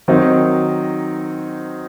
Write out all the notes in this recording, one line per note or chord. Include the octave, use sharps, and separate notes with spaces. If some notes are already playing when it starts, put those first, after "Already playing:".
D#3 F#3 C4 D#4